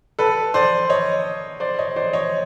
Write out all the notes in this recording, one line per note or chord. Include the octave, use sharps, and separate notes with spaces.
A4 B4
C5 D5
C#5 D#5
C5 D5
C#5 D#5
C5 D5
C#5 D#5